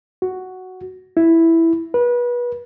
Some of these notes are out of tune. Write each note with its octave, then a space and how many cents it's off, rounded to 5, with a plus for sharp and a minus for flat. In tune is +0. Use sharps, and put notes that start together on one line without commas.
F#4 +5
E4 +0
B4 -30